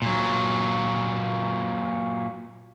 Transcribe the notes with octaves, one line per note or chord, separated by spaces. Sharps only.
A#2 F#3